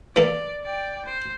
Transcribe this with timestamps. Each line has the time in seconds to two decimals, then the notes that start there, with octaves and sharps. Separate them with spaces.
0.16 E3 A#3 A4 D5
0.64 D5 G5
1.05 C5